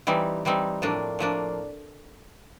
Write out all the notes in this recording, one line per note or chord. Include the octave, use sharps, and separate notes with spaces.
E3 G3 C4 D#4
E3 G3 C4 D#4
A2 F3 A#3 D4
A2 F3 A#3 D4